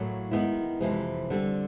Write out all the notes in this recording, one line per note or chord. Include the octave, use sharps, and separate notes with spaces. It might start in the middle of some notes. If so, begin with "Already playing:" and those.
Already playing: A2 F#3 A#3
D#3 G#3 B3 E4
F2 C3 E3 G#3
D3 G3 C4